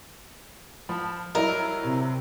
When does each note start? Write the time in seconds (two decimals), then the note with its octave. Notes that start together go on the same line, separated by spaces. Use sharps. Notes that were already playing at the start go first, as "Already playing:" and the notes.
0.89 F3 A5 B5
1.35 F#3 G3 E4 A#4 D#5
1.83 C3